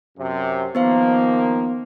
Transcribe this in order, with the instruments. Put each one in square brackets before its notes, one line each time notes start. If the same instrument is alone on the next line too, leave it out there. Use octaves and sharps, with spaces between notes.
[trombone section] F#2 C3
[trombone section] D#3 F3 A#3 [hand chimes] B3 C5 F5